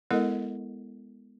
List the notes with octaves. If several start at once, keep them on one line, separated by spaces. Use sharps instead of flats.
G#3 B3 E4 A4 A#4 D#5